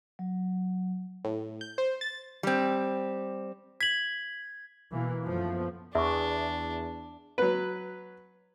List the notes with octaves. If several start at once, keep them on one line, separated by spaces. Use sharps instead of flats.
F#3
A2
G6
C5
A6
G3 C4
G#6 B6 F#7
B2 E3 A#3
F#2 F3 A3 B3
E2 D4 E5 C#6
F#3 B4